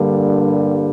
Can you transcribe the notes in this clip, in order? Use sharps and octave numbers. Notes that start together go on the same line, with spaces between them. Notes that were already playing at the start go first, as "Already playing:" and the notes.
Already playing: G2 D3 G3 A#3